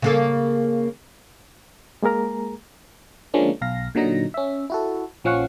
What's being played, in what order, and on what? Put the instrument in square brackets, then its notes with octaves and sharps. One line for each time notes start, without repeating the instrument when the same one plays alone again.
[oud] C#3 A#3 A4
[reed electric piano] G#3 A#3 G#4 A#4 A#5
[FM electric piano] D3 F3 G#3 A#3 C#4 D4
B1 F5 A#6
A#2 D3 F#3 D#4 A#6
C#4 E5
E4 F#4 A4
A#1 F3 C#4 F5 F#5 C#6